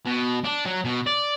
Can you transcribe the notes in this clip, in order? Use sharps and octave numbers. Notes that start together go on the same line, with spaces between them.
B2
D4
F#3
B2
D5